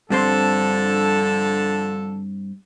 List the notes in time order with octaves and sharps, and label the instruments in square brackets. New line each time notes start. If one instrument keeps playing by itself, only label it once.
[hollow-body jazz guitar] G2 C4 C6 [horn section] D3 F3 A4